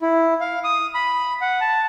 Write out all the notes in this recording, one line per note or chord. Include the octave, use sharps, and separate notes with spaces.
E4
F5
D#6
B5
F#5
A5